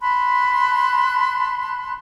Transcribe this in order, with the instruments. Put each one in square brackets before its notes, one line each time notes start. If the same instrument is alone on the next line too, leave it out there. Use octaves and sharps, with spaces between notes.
[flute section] A5 B5 C6 F#6